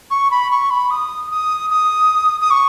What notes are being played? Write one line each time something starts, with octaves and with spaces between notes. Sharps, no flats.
C#6
B5
C#6
B5
D#6
D#6
D#6
D#6
C#6